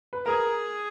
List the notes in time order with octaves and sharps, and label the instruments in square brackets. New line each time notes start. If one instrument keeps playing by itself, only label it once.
[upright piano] B4
[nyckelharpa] G#4 [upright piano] A#4